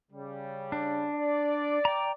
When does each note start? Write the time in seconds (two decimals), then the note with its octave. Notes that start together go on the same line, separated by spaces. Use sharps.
0.12 C#3 G3
0.72 D4
1.15 D5
1.85 G5 A#5